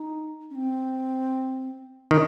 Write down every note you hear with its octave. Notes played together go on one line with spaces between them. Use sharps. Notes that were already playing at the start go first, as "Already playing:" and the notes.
Already playing: D#4
C#4
C4
D#3